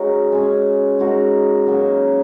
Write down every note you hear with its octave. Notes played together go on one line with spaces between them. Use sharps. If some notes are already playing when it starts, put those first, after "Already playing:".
Already playing: G#3 C#4 D#4 F#4 A#4
G#3 C#4 G#4
G#3 D#4 F#4 A#4
C#3 F#3 A#3 C#4